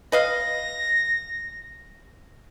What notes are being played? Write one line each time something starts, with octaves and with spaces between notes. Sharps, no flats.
B4 D#5 F5 A#6